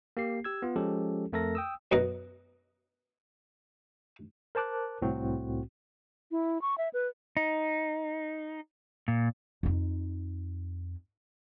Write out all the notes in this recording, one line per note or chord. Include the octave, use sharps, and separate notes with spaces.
A#3 G4 C7
G4 E6 G#6
B3 F4
F3 G#3 C#4 G4 A4
F2 A3 A4 A#4 A#6
G5 D#6 E6
F#2 B2 B4 D#5 A#5
A#4 C5 A5 D6 F#6
C2 A2 C4 F#4
E4
C#6
E5
B4
D#4
A#2
F2 D#4